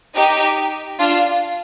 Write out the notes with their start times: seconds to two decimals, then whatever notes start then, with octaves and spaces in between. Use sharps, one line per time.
0.15 D#4 G4
0.99 D4 F4